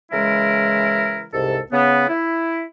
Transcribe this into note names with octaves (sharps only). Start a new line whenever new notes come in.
C#3 E3 G#3 E4 A#4
C2 G#2 C3 A4
C#3 B3
E4